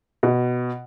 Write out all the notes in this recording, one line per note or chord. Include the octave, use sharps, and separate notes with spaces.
B2